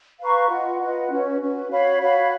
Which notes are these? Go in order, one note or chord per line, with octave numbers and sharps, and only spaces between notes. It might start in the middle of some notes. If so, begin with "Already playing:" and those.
B4 F5 A#5 C#6
F4 B4 D#5 F#5
F4 B4 D#5 F#5
C#4 F#4 B4
C#4 F#4 B4
F#4 C#5 F5 B5
F#4 C#5 F5 B5